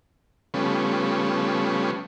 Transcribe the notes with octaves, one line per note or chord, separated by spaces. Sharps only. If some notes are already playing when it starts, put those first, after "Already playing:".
C#3 F3 G3 A3 B3 C#4